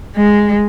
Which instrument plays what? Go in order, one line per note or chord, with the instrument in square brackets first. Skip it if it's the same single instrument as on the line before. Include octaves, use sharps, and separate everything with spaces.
[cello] G#3